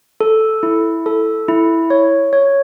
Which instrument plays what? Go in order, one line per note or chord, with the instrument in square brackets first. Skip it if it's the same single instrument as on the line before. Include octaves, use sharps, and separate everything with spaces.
[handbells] A4
E4
A4
E4
C#5
C#5